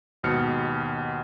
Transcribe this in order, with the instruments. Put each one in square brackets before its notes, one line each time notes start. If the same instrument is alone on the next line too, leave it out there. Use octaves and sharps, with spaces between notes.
[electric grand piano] D#2 G#2 B2 F6 C#7